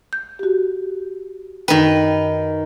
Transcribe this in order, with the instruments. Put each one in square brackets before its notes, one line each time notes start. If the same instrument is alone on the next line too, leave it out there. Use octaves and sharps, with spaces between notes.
[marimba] G6
F#4 G4
[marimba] F#2 G5 [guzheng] D#3 B4